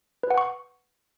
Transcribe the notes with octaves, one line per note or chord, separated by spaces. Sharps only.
B4
F#5
C#6